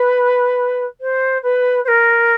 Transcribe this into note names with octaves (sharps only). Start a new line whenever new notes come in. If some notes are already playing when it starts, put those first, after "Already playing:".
Already playing: B4
C5
B4
C5
A#4